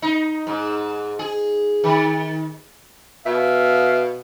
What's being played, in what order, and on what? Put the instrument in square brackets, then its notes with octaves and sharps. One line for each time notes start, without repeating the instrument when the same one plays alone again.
[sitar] D#4
G#2
G#4
D#3
[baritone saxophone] B2 [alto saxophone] E5 [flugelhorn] F5